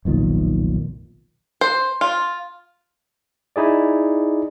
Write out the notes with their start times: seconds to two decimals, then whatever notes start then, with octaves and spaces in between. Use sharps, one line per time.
0.05 F1 B1 A#2 D#3
1.61 C5
2.01 F4
3.56 D#4 E4 G#4 D5